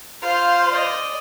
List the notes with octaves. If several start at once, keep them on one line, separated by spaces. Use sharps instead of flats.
F4 C5 F5
D5 D#5